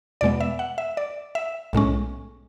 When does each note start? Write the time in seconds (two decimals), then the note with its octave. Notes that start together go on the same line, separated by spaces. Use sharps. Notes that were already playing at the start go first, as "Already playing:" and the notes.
0.21 E2 B2 G#3 B3 D5
0.41 E5
0.59 F#5
0.78 E5
0.97 D5
1.35 E5
1.73 B1 A2 G#3 C#4